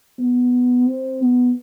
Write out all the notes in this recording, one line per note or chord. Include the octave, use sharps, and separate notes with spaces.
B3
C4
B3